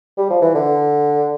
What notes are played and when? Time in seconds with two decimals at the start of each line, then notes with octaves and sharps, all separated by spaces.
0.17 G3
0.30 F3
0.41 E3
0.54 D3